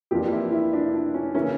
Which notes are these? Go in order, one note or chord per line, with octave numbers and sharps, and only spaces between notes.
F2 E3 A#3 D4 F4 G4
E4
E4
D4
D4
C#4
C#3 E3 A#3 C#4 E4